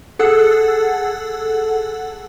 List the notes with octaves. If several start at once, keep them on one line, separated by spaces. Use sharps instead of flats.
G#4 A4 F#5 E6 F#6